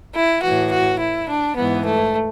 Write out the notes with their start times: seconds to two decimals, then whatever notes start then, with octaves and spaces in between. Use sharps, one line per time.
0.14 E4
0.43 A2 E3 F#4
0.71 F#4
1.00 E4
1.28 D4
1.57 G#2 E3 B3
1.85 A3